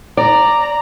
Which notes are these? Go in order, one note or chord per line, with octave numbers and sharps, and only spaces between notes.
D5 A#5